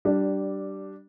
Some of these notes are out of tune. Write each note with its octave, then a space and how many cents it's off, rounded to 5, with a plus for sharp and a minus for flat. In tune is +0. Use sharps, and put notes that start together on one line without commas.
G3 -20 D4 +0